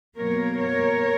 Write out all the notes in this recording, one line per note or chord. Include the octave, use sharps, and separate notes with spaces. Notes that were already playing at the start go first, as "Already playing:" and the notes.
B2 F#3 A#3 A#4 C#5
A#4 C#5